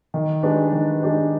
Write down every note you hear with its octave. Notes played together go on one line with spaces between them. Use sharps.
D#3
G#3 D4 G4 B4
D#3
G#3 D4 G4 B4